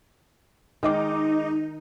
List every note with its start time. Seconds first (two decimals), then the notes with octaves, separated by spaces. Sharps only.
0.83 D#3 G#3 D#4 D#5 D6